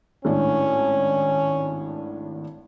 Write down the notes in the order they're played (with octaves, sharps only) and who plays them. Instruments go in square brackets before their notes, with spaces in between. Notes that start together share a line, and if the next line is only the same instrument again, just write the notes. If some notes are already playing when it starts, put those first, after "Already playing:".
[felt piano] G#1 A2 D4 [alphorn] C#4